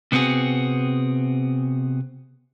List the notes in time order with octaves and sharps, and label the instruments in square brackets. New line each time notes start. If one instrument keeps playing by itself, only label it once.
[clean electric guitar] C3 B3 C4 F#4 G#4